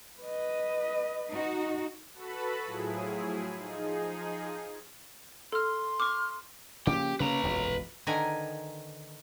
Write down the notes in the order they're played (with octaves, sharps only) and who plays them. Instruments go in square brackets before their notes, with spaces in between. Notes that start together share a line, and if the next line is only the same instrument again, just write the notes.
[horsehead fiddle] B4 D#5
[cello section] D#4 F#4
[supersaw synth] F#4 A4 B4 A5 B5
A2 F3 F#3 E4 G#4
F3 D#4 G#4
[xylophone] A4 F6 [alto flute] C6
[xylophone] C#6 D6 [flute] F6
[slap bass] C#3 F3 A#3 [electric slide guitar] G4
[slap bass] C#3 A3 A#3 [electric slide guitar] B4 A#5
[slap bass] E1 A#1 F#2
[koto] D3 D#3 A#4 B4 G#5 A#5